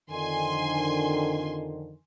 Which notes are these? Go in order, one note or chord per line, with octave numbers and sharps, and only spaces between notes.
F2 D3 D#3 G#5 C6